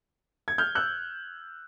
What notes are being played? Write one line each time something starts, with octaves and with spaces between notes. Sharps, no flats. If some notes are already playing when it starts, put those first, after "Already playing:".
G#6
F6 G6
E6 F#6